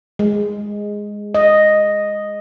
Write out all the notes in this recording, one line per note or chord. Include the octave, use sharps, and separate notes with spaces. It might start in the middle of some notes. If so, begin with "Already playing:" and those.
G#3
D#5